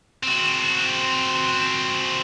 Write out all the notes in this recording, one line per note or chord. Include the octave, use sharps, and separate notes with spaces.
C4 F#4